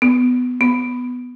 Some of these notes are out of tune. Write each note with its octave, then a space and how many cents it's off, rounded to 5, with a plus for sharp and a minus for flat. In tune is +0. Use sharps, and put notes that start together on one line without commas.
B3 +15
B3 +5